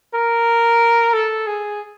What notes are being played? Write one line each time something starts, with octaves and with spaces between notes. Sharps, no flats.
A#4
A4
G#4